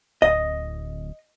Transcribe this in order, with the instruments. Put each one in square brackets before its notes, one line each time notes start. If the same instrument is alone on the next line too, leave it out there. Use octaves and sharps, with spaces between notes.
[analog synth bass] D1 [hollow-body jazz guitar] D#5